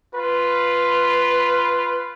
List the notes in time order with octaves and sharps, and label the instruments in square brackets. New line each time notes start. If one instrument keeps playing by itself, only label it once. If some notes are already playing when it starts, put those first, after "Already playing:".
[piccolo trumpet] F4 [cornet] B4